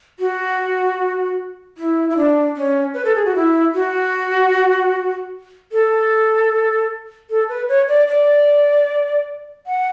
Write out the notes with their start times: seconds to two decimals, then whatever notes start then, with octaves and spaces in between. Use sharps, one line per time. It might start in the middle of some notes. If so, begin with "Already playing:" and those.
0.19 F#4
1.78 E4
2.10 E4
2.17 D4
2.56 C#4
2.94 B4
3.05 A4
3.15 G#4
3.25 F#4
3.36 E4
3.74 F#4
5.72 A4
7.30 A4
7.49 B4
7.69 C#5
7.88 D5
8.08 D5
9.67 F#5